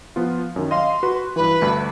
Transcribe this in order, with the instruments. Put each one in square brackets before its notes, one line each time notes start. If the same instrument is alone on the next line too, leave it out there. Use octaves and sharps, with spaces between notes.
[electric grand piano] F3 B3 F4
F#2 D#3
[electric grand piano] D#5 F5 [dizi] C6
[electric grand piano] F#4 B4
[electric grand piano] G2 E3 [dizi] B4
[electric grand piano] D2 G2